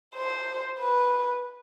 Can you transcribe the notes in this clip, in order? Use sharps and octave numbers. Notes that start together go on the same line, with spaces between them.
C5
B4